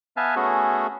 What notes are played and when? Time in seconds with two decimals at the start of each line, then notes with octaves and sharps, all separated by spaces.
0.17 B3 B4 E5 F5 G#5 A5
0.36 A3 B3 C#4 F#4 G#4 A4